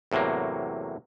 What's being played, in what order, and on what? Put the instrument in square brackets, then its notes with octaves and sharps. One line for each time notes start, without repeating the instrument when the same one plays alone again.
[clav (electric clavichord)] E2 A2 C3 F#3 A#3